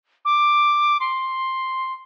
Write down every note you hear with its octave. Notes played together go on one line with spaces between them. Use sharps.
D6
C6